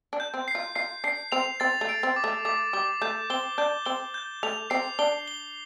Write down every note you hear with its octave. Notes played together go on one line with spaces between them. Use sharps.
D4
G6
C4
C7
F4
F4 C7
D4 C7
C4 F7
C4 A6
A3
D7
C4
D6
A3
A3 D6
G3 D6
A3 G6
C4 G7
D4 G6
C4 G7
G6
A3 F7
C4 C7
D4 G7
G7